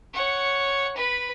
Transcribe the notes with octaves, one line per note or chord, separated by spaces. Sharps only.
C#5 F#5
B4 B5